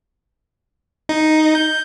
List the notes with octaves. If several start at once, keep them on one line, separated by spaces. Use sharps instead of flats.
D#4
G6